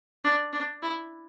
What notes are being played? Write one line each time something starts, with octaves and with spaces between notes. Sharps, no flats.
D4
D4
E4